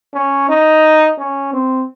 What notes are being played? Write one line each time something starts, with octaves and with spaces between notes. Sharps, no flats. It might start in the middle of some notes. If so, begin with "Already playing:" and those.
C#4
D#4
C#4
C4